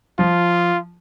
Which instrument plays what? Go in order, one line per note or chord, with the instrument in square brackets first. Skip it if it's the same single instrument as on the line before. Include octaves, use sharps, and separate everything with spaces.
[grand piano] F3 [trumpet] F4